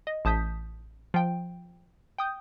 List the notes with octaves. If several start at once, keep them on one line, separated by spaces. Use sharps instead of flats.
D#5
A1 A5 D#6 G6 B6
F3 G5
G5 D#6 G6